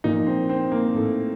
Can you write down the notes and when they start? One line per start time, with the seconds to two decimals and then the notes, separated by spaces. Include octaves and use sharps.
0.04 A#2 F3 A#3 D#4
0.27 C4
0.49 C4
0.72 A#3
0.94 A2 A3 D#4 A4